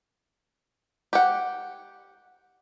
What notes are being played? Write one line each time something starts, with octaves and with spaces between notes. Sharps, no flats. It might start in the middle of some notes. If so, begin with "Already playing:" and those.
G4 F#5